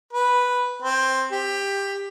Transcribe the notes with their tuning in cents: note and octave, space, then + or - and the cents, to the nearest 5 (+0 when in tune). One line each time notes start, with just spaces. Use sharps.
B4 -5
C4 +10
G4 +15